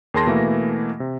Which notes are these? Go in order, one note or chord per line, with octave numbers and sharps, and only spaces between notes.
D#2 G#4 A#4 A5 C6 A#6
B2 E3 A3 A#3
C3